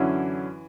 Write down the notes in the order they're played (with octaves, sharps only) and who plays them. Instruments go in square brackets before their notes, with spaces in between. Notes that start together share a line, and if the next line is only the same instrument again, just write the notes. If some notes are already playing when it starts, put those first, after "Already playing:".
Already playing: [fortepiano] F#2 D3 F#3 C#4 E4 [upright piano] E3